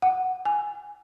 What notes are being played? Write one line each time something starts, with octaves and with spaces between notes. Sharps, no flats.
F#5
G#5